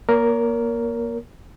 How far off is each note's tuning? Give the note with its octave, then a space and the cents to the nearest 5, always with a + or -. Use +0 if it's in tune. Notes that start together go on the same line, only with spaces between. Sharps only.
A#3 +25 A#4 +0 C#5 +35